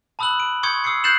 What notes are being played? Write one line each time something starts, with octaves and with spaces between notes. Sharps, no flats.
A5 B5 D#6 E6 F#6 F#7
D7
C6 C#6 D#6 G6 G#6 C#7
D#6 E6 G#6 C7 C#7
F#6 G6 A6 C7 E7 F#7